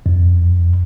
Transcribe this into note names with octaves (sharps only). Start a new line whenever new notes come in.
F2